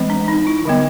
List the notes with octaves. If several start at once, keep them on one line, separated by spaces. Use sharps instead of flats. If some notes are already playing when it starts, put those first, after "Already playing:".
Already playing: E3 G#3 C4
D4
D#4
E4
D3 G3 B3